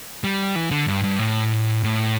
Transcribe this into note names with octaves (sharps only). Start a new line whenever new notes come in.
G3
E3
D3
G2
G2
A2
A2